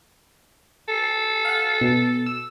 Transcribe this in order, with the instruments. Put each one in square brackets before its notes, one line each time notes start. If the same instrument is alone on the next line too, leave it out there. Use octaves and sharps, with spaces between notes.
[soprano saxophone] A4
[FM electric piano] F5 F#5
B2
E6